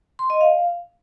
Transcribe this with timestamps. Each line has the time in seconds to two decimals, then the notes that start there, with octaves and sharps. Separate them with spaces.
0.19 C6
0.30 D#5
0.41 F5